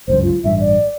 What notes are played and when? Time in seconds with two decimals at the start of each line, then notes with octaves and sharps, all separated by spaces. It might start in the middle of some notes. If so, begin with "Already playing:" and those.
0.08 G1 C#2 F#2 C5
0.23 F4
0.44 A1 G2 E5
0.60 D5